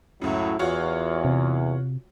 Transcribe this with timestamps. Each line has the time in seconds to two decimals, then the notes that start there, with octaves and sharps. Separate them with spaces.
0.22 C#2 F#2 A2 F#3 E4
0.59 E2 F4 F#4 C#5
1.25 C3